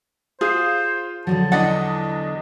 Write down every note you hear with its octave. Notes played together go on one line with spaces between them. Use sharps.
F4 G#4 C5 F5
D3 F3 F#3 A5
E2 D4 D5 D#5 F#5